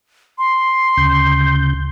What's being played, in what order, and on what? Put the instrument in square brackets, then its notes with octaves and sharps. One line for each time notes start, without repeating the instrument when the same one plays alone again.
[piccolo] C6
[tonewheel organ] D2 C#3 G6